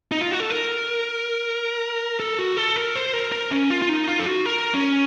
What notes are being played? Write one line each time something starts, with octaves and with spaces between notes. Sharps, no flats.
D#4
F4
F#4
A4
A#4
A4
F#4
A4
A#4
C5
A#4
A#4
C#4
F4
F4
D#4
F4
A4
F#4
A#4
C#4